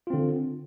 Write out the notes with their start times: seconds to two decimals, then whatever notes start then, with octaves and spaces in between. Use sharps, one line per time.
0.07 F4
0.10 C4
0.13 D3